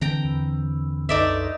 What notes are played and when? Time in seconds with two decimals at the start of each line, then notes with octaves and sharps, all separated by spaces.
0.01 D3 E3 C4 G5 A#5
0.24 E2
1.09 C2 F#2 D#4 A4 D5 E5